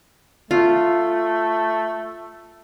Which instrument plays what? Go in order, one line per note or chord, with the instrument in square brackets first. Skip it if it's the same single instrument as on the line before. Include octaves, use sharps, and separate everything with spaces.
[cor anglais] A3 [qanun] F4